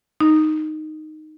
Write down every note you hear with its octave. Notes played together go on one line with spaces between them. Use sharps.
D#4